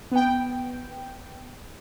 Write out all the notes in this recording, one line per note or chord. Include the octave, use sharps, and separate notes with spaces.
B3 G5